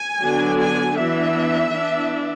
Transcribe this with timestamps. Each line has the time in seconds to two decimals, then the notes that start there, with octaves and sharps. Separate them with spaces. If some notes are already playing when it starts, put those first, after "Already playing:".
Already playing: G#5
0.21 D3 F#3 B3 D4
0.59 G#5
0.97 E3 B3 D4 E5
1.74 E3 B3 D4